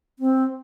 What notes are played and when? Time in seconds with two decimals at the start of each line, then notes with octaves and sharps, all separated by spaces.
0.19 C4